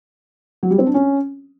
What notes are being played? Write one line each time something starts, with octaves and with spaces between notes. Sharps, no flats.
F#3
G3
C4
D4
C#4